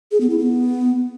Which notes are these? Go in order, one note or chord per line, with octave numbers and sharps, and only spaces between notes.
G#4
B3
E4
B3